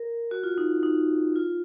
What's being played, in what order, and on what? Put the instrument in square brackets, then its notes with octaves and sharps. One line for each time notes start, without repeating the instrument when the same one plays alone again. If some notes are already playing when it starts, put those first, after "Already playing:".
Already playing: [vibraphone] A#4
F#4
F4
D#4
D#4
F4